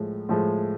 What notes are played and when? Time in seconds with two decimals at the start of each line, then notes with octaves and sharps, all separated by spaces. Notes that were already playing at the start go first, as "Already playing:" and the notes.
Already playing: A2 F3 G#3
0.29 A2 F3 G#3